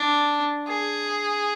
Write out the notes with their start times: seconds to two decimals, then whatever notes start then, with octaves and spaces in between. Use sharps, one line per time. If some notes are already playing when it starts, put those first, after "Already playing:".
Already playing: D4
0.68 G#4